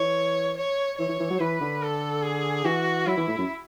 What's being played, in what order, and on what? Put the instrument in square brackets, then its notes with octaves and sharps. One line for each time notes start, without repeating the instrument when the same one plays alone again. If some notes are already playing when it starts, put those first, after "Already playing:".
Already playing: [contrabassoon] E3 [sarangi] C#5
[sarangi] C#5
[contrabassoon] E3 [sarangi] C#5
[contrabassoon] E3
E3
F#3
[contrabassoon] E3 [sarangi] B4
[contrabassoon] D3
[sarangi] A4
G#4
[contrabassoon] E3 [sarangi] F#4
[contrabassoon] F#3 [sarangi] E4
[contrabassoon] E3
A2
F#2